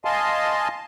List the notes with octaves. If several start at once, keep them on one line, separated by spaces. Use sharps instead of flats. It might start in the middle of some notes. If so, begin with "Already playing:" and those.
D#5 F5 G#5 A5 C6